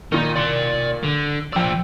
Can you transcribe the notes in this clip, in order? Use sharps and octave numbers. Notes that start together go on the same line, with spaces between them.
A#2 D#3 D#4
D5 C6
D3
F3 D5 G5 E6